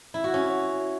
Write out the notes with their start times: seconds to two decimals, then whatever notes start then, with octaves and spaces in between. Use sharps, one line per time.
0.14 E4
0.24 F#4
0.34 C#4